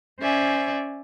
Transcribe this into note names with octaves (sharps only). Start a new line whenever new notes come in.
C#4 C5 D5 E5 G#5